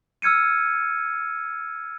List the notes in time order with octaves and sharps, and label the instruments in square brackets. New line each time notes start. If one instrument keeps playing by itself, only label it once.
[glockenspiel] E6 F6 G#6 C#7 D#7